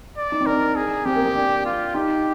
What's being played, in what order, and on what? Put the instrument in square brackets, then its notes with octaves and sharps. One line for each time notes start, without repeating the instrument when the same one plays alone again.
[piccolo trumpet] D5
[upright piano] D#4
C4
[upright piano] D4 [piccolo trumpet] A#4
[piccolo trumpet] G#4
[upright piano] C4 [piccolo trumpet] G4
[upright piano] A#3
C4
D4
[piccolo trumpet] F4
[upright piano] D#4 [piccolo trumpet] G4